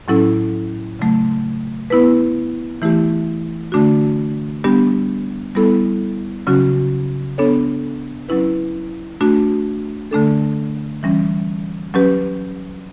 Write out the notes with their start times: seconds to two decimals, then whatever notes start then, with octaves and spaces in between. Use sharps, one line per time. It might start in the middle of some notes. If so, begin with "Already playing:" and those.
0.08 A2 F#3 C#4 E4 A4
0.99 C#3 F#3 A3
1.90 B3 E4 B4
2.82 E3 A3 E4 G4
3.72 D3 A3 D4 F#4
4.64 G3 B3 D4 G4
5.55 G3 B3 E4 A4
6.47 C#3 F#3 C#4 F#4
7.38 B3 D4 A4 C#5
8.29 F#3 C#4 E4 B4
9.21 A3 D4 F#4
10.11 D3 A3 D4 A4
11.03 E3 G3 C#4
11.94 F#3 C#4 G4 B4